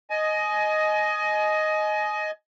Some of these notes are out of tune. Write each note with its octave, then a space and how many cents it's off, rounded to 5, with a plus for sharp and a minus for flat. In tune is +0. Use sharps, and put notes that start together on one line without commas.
D#5 +0 G#5 +30